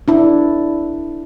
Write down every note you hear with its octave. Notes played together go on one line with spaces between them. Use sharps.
D4 E4